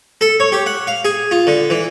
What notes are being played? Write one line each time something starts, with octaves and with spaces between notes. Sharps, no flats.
A4
C#5
G4
F#5
F5
G#4
F4
D3
E3